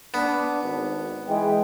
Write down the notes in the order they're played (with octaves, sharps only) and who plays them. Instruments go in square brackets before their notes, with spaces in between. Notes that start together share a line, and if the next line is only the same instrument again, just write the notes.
[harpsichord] B3 [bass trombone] D4
[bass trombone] G#1
[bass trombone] E3 [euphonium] G#3 [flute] G5